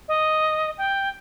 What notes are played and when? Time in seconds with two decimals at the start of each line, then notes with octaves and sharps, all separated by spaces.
0.08 D#5
0.78 G5